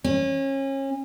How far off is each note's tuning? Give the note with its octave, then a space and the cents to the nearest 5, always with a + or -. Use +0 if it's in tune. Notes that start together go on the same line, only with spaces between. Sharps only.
C#4 -30